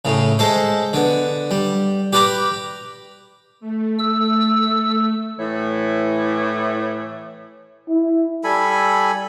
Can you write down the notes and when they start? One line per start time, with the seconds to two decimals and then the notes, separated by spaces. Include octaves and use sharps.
0.05 A2 C#3
0.39 G#3 A4 C5
0.93 D3 B3
1.51 G3
2.13 G4 B4 D5 A#5 B5
3.60 A3
3.99 E6
5.39 A2 E3 E4 C#5
7.88 E4
8.44 G3 A4 G#5 B5